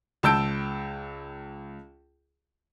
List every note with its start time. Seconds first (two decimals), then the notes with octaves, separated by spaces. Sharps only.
0.23 C#2 A5 E6 G6 D7